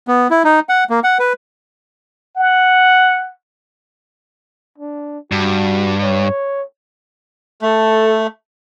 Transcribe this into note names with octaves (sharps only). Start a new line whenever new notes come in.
B3
E4
D#4
F#5
A#3
F#5
B4
F#5
D4
G2 F#4
C#5
A3 A4